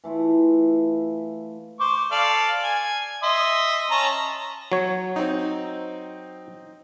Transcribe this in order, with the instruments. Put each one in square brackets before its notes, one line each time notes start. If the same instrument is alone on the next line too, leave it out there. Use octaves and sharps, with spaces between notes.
[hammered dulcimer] E3 A3 E4 F4
[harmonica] C5 C#6 D6
A4 D5 F5
G#5
D#5 E5 C6
C#4 A5 A#5
[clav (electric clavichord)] F#3 C#5
[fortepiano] C4 D#4